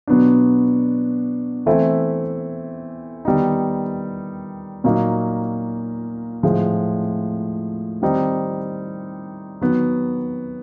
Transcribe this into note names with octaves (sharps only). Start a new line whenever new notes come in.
B2 F#3 B3 D4
E3 A3 C4 E4
D#3 G3 B3 D#4
A#2 F#3 A#3 D#4
A2 F3 G#3
D#3 G3 C4 D#4
D#3 F#3 B3